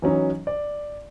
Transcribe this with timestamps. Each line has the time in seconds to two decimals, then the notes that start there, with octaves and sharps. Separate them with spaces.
0.02 E3 F#3 C#4 D#4
0.47 D5